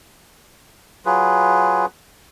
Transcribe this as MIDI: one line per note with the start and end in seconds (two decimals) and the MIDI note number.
1.06 1.86 54
1.06 1.86 65
1.06 1.86 68
1.06 1.86 71